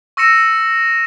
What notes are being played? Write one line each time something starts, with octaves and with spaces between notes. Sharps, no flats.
C#6 E6 A#6 C#7 E7